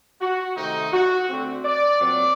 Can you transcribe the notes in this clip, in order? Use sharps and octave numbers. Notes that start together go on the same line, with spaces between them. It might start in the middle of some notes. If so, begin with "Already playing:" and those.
F#4
C3 D#3 A3 C4 D#4
F#4
D3 A3 C4
D5
A#2 F#3 C4 D5